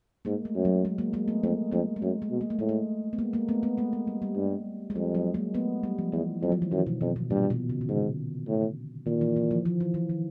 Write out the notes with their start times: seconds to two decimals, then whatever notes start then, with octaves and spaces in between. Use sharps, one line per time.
0.25 G#2 G#3 A#3
0.45 A3
0.55 F#2
0.65 F#3
0.85 G#3
0.98 G#3 A#3
1.13 G#3 A#3
1.28 A3 B3
1.43 F2 G#3 A#3
1.72 F2 G#3 A#3
1.96 G#3
2.02 F#2 A3
2.22 G#3
2.31 B2
2.41 A#3
2.50 A3
2.59 A2 G#3
2.69 A3
3.13 B3
3.19 G#3 A#3
3.33 G#3 A#3
3.48 A3 B3
3.63 A3 B3
3.77 G#3 A#3
3.93 G#3
4.07 G3
4.22 G3
4.36 G2
4.90 G#3
4.95 F2 G3
5.15 F#3
5.34 G#3 A#3
5.54 A3 B3
5.83 G3
5.98 F3
6.12 E2 E3
6.42 F2 F#3
6.52 F3
6.62 E3
6.72 F#2 D#3
6.87 B2
7.01 F2 B2
7.16 B2
7.30 G2 A#2
7.50 B2
7.69 C#3
7.81 D#3
7.89 G#2 D3
8.48 A2
9.06 A#2 D#3
9.21 E3
9.36 E3
9.51 F3
9.65 F3
9.81 E3
9.94 E3
10.09 D#3